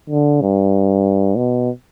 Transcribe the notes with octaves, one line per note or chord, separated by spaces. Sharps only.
D3
G2
B2